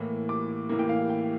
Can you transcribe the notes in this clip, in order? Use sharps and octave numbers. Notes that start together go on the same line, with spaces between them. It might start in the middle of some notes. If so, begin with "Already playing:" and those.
Already playing: A2 E3 A#3
D6
A2 E3 A#3
G5
F5
G5